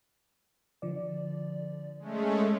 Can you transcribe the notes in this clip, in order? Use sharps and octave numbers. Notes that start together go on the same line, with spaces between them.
D3 F3 D5
G#3 A3 C#4